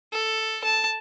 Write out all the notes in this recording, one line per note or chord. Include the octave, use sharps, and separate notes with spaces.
A4
A5